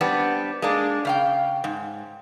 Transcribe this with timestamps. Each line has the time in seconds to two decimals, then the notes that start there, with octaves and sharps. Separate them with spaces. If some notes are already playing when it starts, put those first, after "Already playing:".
0.01 G3 B3 C4 D4
0.62 G#3 A#3 D4
1.05 C#3 F5 G5
1.64 G#2